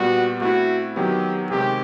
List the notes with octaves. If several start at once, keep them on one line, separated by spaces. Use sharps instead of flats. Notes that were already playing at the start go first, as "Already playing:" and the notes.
Already playing: A#2 G3 B3 F#4
A3 C4 E4 F#4
D#3 F#3 B3 G4
C3 D#3 G#3 C4 G4